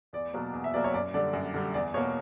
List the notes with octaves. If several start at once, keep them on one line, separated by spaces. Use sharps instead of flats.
E2 D5
B2 F#3 A#3
E2
E5
B2 F#3 A#3 D5
C#5
F#2 D5
D3 G3 D5
F#2
D3 G3
E2 D5
B2 A#3 C#5